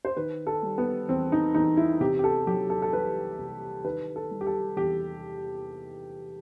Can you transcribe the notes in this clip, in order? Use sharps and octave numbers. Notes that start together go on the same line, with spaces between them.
C5
D#3 B4
A4
G3
B3
E2 C4
D#4
E2 D#4
E4
C3 G4
G4
A4
F#3 G4
A4
A4
C2 B4
C2
D#3 B4
A4
G3
G4
A4
E2 G4